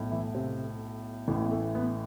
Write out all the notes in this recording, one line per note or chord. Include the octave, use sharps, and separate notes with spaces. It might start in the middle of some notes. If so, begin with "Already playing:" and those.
Already playing: B1 A2
E3 E4
C3 C4
A1 A2 E3
B3
A3
B3